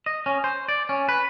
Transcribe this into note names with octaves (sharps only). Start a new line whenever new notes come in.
D#5
C#4
C5
D5
C#4
B4